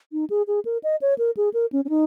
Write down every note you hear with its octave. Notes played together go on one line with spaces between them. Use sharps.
D#4
G#4
G#4
A#4
D#5
C#5
A#4
G#4
A#4
C#4
C#4
D#4